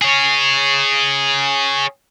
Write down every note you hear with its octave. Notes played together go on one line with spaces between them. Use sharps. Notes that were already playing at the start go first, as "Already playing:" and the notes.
G#4 C#5